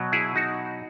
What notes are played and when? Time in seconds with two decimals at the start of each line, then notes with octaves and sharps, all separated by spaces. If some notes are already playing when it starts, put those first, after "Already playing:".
Already playing: B2 F#3
0.12 E4 G#4
0.36 D#4 F#4